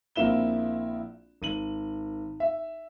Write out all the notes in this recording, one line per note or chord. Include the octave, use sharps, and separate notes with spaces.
A#1 A#3 C4 E4 E7 G7
G#1 D#7 F#7
E5